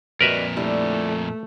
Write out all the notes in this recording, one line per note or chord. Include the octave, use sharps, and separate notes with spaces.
F2 A#2 G3 F#4 A#4 B4 D#5 E5
D3 G3 A3 E4